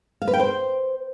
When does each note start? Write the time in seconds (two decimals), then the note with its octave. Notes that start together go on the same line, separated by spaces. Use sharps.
0.22 F5
0.28 B4
0.34 G5
0.40 C5